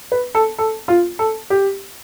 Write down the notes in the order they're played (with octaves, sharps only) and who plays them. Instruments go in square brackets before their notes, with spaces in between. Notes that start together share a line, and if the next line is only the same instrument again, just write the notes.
[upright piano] B4
A4
A4
F4
A4
G4